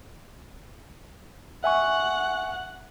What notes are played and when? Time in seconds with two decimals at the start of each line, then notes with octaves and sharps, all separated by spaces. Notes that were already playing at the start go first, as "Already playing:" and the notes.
1.64 E5 F#5 G#5 C#6